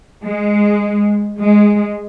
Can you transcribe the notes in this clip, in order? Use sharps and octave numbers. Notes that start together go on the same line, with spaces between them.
G#3
G#3